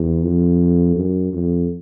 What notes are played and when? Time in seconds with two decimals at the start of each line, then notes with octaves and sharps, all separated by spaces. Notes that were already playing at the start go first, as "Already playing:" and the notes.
Already playing: E2
0.23 F2
0.96 F#2
1.33 F2